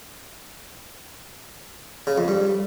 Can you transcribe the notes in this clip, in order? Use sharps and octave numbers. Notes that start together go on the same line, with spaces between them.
C#3
F2
G2